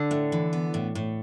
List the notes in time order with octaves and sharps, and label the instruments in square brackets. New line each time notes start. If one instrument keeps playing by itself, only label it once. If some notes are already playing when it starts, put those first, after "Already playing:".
Already playing: [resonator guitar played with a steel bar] D3
[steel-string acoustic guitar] A2
E3
B3
A2
A2